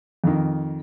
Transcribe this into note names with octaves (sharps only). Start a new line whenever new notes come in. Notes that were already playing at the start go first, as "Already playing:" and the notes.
F2 D#3